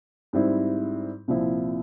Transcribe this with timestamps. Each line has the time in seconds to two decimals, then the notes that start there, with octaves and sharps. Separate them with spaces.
0.33 G#2 G3 C4 E4
1.28 C2 A#2 F3 C4 E4